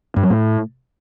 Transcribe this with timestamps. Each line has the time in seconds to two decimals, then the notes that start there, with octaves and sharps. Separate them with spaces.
0.16 G2
0.23 F#3
0.30 A2